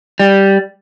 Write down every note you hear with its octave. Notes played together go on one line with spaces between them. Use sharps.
G3